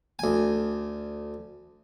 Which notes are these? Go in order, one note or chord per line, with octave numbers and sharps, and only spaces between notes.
D2 G#5